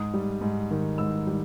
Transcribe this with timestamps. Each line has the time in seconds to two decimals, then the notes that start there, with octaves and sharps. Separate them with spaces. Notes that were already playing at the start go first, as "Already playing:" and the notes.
Already playing: G#2 D#6
0.14 G3
0.41 G#2
0.71 D#3
0.98 G#2 E6
1.27 G3